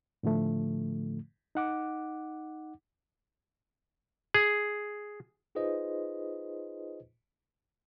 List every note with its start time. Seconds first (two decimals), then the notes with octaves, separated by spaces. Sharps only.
0.23 A2 D3 F3 A3
1.55 D#4 F#5 D6
4.34 G#4
5.55 D#4 F4 G#4 B4 C5 D#5